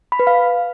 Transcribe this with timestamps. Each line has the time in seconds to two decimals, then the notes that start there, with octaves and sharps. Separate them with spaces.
0.12 B5
0.19 B4
0.27 F5